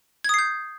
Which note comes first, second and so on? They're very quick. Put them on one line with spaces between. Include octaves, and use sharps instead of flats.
G#6 D#6 C7 G6